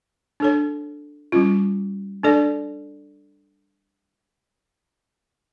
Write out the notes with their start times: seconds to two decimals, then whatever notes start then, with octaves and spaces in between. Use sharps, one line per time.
0.40 D4 A4 C#5
1.32 G3 C#4 F4
2.23 D4 A4 D5